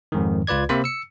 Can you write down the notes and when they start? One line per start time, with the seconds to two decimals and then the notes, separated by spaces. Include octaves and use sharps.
0.12 F2 G#2 D#3
0.47 C#2 F4 B4 D5 G#6
0.69 C3 A#3 C5 B5
0.84 E6 C#7